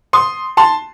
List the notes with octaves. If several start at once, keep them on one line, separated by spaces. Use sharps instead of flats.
C6 D#6
A5 C6